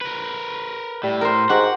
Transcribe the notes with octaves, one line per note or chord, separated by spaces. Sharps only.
A#4 B4
A2 G3
A#4 C5
G#2 F#4 G4 F#5